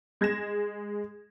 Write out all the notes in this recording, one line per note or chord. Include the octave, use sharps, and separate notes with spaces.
G#3 G#6 A#6 E7